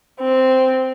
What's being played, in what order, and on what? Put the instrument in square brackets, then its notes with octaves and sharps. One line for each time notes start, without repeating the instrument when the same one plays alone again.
[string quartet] C4